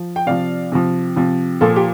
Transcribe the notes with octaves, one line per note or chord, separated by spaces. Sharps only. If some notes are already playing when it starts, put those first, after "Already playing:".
Already playing: F3
G5
C3 F3 D5 F5
C3 F3
C3 F3
A#2 F3 A4
G4